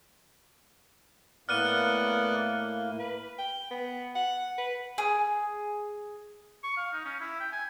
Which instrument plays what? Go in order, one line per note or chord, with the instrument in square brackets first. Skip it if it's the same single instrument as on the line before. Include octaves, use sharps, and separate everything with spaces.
[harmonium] A2 A#3 [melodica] B3 D5 F#5 [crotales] F6 F#6 D#7
[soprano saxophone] B4
G5
B3
F#5
B4
[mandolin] G#4
[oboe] C#6
F5
D#4
C#4
E4
G5
G#5